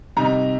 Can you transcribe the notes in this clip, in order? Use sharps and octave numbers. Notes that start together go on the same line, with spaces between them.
C3 G3 D#4 A#5